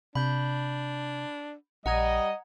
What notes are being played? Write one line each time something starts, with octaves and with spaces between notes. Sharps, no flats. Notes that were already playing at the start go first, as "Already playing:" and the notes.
C3 D4 B5 G6
A#1 G3 D#5 F#5 A#5 G#6